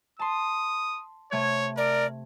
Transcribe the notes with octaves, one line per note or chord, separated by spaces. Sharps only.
A5 C6 D#6
C3 A3 C#5 G#6
A#4 D5